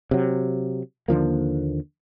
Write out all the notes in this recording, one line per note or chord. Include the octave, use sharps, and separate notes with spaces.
C3 F#3
D#2 D3 F3 A#3